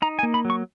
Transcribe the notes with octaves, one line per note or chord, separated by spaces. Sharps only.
D#4 A#5
G#5
A#3
B5
F#3
C#6